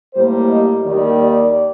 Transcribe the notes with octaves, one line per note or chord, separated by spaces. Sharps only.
A2 G3 A#3 C5
D#5
D#2 D#3 G3 A#3 D5
D5